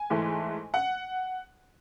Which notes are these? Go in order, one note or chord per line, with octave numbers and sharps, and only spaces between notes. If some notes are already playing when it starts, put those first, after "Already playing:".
Already playing: G#5
G#2 E3 A3
F#5